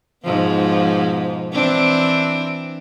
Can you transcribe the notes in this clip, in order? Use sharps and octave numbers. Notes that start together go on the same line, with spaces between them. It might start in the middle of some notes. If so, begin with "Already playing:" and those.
G#2 B2 F3
E3 C4 D4